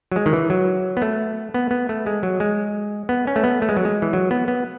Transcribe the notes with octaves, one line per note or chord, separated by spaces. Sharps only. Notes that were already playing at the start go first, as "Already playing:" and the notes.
F#3
G#3
D#3
E3
F#3
B3
A3
B3
B3
A3
G#3
F#3
G#3
B3
C#4
A3
B3
A3
G#3
F#3
G#3
E3
F#3
B3
B3